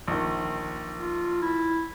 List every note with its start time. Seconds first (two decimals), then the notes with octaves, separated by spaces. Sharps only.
0.08 A#1 D#3
0.99 F4
1.42 E4